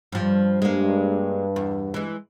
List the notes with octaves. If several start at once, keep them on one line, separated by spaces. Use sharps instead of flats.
G2 F3
G2 G#3 A#3
E2
E3 G#3